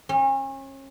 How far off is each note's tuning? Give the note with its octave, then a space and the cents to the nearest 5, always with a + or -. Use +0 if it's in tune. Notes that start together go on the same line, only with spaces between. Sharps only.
C#4 -35